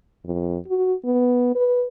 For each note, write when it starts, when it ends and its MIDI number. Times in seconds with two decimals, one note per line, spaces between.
0.25 0.57 41
0.68 0.94 66
1.05 1.51 59
1.55 1.86 71